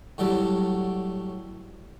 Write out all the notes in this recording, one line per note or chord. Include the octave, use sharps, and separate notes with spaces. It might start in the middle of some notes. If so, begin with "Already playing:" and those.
A2 F#3 G3 A4